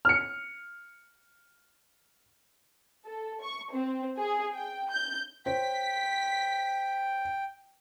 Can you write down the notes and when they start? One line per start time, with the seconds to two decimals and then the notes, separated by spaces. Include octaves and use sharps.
0.05 F6 C#7
3.05 A4
3.42 C#6
3.72 C4
4.19 G#4
4.54 G5
4.91 G6
5.46 C5 C#5 G5 B6